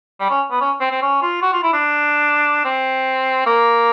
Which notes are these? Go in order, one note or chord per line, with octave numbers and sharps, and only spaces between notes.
G3
C#4
B3
C#4
C4
C4
C#4
F4
F#4
F4
E4
D4
C4
A#3